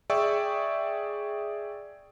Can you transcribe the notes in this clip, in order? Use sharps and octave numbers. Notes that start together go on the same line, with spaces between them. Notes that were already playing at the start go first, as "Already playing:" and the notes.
G#4 D5 E5 G5 C#6 E6